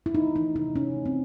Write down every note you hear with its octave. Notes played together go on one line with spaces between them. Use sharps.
E4
A3 D#4
E3 D#4
C3 D#4
C3 C#4
A3
C4